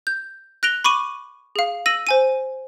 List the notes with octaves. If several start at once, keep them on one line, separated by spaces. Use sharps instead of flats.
G6
F#6 A#6 D7 F7 G7
B5 C#6 D6 D#7
G#4 F5
E6 A#6 D#7 F#7
C5 G#5 D#7